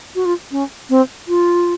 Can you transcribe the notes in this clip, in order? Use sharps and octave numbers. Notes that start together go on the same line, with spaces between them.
F#4
F4
C#4
C4
F4